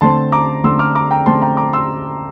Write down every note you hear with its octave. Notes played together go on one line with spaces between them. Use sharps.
D3 A3 C4 A5 C6
A#5 D6
D3 A3 C4 C6 E6
D6 F6
A#5 D6
G5 A#5
D3 A3 C4 A5 C6
G5 A#5
A#5 D6
C6 E6